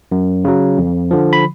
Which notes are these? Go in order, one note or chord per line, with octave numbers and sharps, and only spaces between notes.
F#2
C#3 F#3
F2
D3 F3
B5